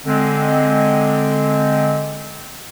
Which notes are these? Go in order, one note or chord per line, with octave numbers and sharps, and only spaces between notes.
D3 G#3 C4